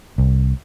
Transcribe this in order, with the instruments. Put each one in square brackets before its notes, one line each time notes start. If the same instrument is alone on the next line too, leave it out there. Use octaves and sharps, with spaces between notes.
[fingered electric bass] C2